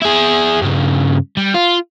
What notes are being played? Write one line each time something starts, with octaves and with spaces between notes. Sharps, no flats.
E4 G#4
G2 C#3
G3
F4